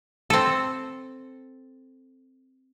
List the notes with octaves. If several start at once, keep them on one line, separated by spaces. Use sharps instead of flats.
C4 A4